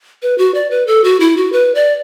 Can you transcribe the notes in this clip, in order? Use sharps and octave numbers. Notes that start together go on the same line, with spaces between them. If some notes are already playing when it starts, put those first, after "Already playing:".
B4
F#4
D5
B4
A4
F#4
E4
F#4
B4
D5